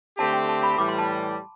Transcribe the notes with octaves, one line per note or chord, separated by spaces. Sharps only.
D3 A3 C4 G4 A5
G5
A5
B5
A2 E3 G3 D6
C6
A5